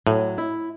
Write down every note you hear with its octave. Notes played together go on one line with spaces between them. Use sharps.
A2 F#3
E4